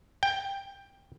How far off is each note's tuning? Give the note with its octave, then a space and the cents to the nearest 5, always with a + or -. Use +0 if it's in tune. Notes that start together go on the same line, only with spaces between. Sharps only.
G5 +10